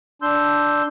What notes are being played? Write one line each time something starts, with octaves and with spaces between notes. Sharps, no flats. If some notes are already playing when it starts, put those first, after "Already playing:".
D4 C6 E6 G6